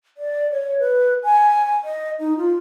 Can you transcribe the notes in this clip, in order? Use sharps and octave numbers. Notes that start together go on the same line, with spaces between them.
D5
C#5
B4
G#5
D#5
D#4
F4